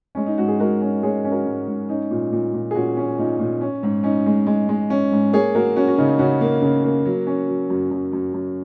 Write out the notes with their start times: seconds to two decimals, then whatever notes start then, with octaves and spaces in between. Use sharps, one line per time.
0.15 G#3 C#4
0.27 D#4
0.38 G#2 F#4
0.48 G#4
0.60 G#3 F#4 A#4
0.81 C#4
1.03 G#3 G#4 C#5
1.25 C#4
1.31 F#4 A#4
1.46 G#2
1.68 G#2
1.89 C#4 D#4
2.11 A#2
2.32 A#2
2.54 A#2
2.71 G#4
2.75 A#2 C#4 F#4
2.97 C#4
3.18 A#2 D#4
3.40 A#2
3.61 C#4
3.83 G#2
4.04 C#4 D#4
4.26 G#3
4.47 G#3
4.69 G#3
4.90 C#4
5.12 G#2
5.33 A#3 G#4 C#5
5.55 A#3 F#4 A#4
5.76 C#4 F#4
5.88 F#4
5.98 C#3 D#4
6.19 C#3 C#4 F#4
6.41 A#3
6.62 C#3
6.84 A#3
7.05 F#3
7.27 C#4
7.48 F#3
7.70 F#2
7.91 F#2
8.13 F#2
8.34 F#2